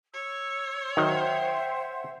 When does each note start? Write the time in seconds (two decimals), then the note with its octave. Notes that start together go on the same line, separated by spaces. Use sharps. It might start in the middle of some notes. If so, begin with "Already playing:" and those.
0.13 C#5 E6
0.97 D#3 F#3 C5 E5 F#5 G5